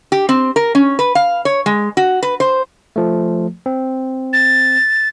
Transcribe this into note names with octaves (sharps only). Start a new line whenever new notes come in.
G4
C4
A#4
C#4
B4
F5
C#5
G#3
F#4
B4
C5
F3 A3
C4
A6